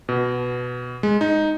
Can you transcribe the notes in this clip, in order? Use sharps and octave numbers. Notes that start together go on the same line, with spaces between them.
B2
G#3
D#4